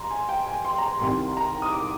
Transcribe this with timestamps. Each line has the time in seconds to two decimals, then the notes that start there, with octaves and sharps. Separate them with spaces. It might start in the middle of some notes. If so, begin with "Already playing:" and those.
Already playing: A#5 C6
0.11 G#5
0.29 G5
0.47 G#5
0.65 C6
0.78 A#5
0.83 C6
1.00 C2 C3 D#3 C6
1.37 A#5
1.62 D#6
1.72 D6